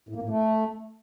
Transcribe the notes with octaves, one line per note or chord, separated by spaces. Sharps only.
A2
A#3
A2
A3